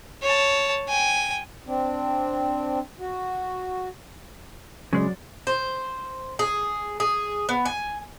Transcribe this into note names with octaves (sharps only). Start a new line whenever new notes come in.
C#5 A5
G5 G#5
C4 D4
F#4
C#3 F#3 G#3 D5
C5
G#4
G#4
B3
G#5